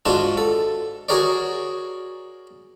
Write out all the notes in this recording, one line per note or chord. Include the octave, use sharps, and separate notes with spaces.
G#2 D4 F4 F#4 A5
A4
F#4 G#4 A#4 C#5 D5